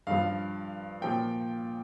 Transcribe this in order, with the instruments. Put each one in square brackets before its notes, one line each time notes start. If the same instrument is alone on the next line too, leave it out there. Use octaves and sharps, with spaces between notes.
[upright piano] G2 F3 F5
A#2 F3 G5